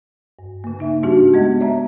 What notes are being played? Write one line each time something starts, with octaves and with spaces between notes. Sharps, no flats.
G2
C#3 A#3
A#3 D#4 E5
G#2 G3 D4 F#4 G4
G#3 B3 D#5
C#5 D5 E5 A5 A#5